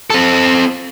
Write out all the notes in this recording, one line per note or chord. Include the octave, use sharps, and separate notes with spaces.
C4 A4